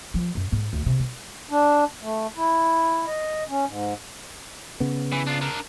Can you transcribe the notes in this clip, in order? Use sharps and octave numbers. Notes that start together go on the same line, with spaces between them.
F3
F#2
G#2
D2
C3
G#3
D4
A3
E4
D#5
C#4
G#2
C#3 B3
E3
D4 F4
D4 A#4